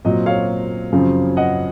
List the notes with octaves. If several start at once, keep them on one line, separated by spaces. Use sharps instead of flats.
A#2 F#3 C4 C5 D#5
C#5 F5
F#2 C#3 F3 C4
D#5 F#5